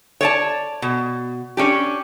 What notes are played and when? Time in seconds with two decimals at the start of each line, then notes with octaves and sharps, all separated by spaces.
0.21 C#5 D5 A5
0.82 B2
1.57 C#4 D4 G4